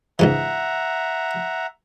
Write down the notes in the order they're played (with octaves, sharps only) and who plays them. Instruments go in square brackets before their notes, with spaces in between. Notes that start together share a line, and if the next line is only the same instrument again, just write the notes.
[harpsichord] C#2 G#2 E3 [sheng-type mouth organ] E5 F#5 A#5